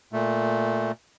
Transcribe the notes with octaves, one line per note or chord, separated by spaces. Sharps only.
A#2 A3